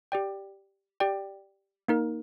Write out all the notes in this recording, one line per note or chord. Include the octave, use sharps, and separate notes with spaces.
G4 D5 G5
G4 D5 G5
A#3 D#4 A#4